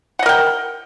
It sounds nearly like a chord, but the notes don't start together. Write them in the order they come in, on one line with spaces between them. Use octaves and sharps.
F#5 D#5 A#4 G5